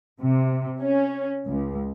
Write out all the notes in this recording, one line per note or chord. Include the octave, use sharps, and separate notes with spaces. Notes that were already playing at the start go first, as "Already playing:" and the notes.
C3
C#4
C#2